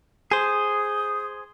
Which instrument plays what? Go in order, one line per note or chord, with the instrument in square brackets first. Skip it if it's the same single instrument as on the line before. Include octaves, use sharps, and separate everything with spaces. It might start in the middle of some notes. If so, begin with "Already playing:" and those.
[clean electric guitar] G#4 C5 [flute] D#6